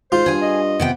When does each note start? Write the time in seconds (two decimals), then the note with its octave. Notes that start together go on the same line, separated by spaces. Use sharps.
0.12 G#2 F4 C5
0.26 G2 G#4 G#5
0.42 D#5
0.80 C3 B3 G5